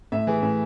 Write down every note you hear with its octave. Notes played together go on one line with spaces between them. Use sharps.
A2 E5
E3 G#4
A2